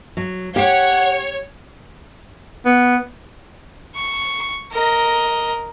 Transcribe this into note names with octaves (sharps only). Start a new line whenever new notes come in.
F#3
G4 C#5 F#5
B3
C#6
A#4 D#5